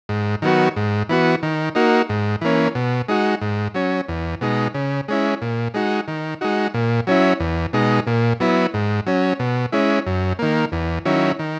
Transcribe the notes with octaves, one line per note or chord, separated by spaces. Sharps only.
G#2
D#3 F#3 B3 F#4
G#2
E3 B3 F#4
D#3
A#3 D#4 F#4
G#2
E3 A#3 C#4
B2
G#3 D#4 F#4
G#2
F#3 C#4
E2
B2 G#3 D#4
C#3
G#3 C#4 E4
A#2
G#3 D#4 F#4
D#3
G#3 D#4 F#4
A#2
F#3 C#4 E4
E2
B2 G#3 D#4
A#2
F#3 B3 E4
G#2
F#3 C#4
B2
G#3 C#4 E4
F#2
D#3 A#3
E2
D#3 F#3 C#4 E4
D#3